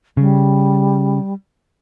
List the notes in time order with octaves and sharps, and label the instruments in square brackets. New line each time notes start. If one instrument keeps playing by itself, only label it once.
[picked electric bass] C#3 [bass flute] G3